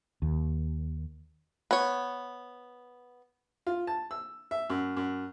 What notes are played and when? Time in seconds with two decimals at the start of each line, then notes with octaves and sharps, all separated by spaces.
0.22 D#2
1.71 B3 C#5
3.67 F4
3.87 A5
4.11 E6
4.51 E5
4.70 F#2
4.97 F#2